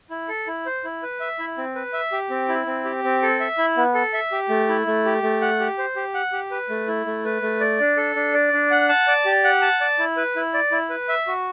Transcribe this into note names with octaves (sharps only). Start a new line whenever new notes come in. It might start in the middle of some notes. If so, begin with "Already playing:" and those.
E4
A4
E4
C5
E4
B4
E5
E4
C4
B4
E5
G4
C4
E4
C4
G4
C4
A4
E5
E4
B3
A4
E5
G4
A3
E4
A3
G4
A3
F#5
G4
C5
G4
F#5
G4
B4
A3
E4
A3
B4
A3
D5
D4
A4
D4
D5
D4
F#5
A5
D5
G4
F#5
A5
D5
E4
B4
E4
D5
E4
B4
E5
F#4